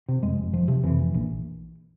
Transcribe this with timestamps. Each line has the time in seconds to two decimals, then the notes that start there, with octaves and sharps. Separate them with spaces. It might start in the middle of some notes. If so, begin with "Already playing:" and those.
0.08 C3
0.23 F2 G#3
0.38 F1
0.53 F1 F3
0.68 C3 F3
0.83 F2 E3
0.99 F1
1.14 A#1